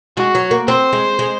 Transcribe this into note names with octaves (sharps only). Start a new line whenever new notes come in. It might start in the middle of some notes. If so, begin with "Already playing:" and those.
G#3 F#4
F#3
A#3
C4 C5
G#3
G#3